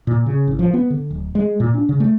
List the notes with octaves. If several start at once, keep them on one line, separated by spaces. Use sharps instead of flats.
A#2
C#3
A1
F3
B3
D3
D1
G#3
A#2
D4
C#3
A3